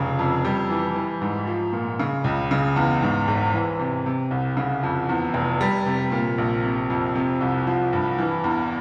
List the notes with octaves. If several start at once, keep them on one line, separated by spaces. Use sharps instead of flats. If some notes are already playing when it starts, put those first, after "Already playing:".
Already playing: F1 C#3
F2
G3
E3
E3
G#2
F3
A#2
C#3
C#2
C#3
E2
G#2
G#1
E3
C3
C3
C2
C#3
F2
E2
F1
G3
C3
A#2
A#1
C3
F2
C3
C2
F3
G2
E3
E2